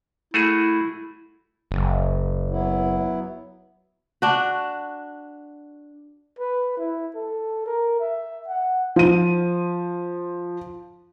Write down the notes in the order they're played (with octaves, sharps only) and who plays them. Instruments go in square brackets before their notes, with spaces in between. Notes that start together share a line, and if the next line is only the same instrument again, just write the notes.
[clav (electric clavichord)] A3 F#4 G#4 [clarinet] E4
[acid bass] F#1
[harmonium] F#3 B3 E4
[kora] D4 F#4
[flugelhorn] B4
E4
A4
A#4
E5
F#5
[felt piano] F3 D#7